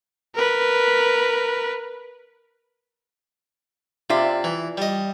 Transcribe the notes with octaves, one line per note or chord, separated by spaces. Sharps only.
A#4 B4
C3 F4 D5 E5
E3
G3 D#5